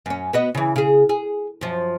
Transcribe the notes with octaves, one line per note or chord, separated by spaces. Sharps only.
F#2 C#4
B3 F#4 D#5
C#3 E3
C#3 G#4
G#4
F#2 F3